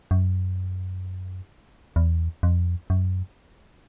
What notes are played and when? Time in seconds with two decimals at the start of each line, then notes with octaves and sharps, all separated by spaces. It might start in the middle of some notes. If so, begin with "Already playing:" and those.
0.11 F#2
1.96 E2
2.43 F2
2.90 F#2